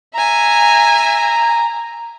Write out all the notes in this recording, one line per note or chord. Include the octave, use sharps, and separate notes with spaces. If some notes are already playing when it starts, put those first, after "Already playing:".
E5 G#5 A#5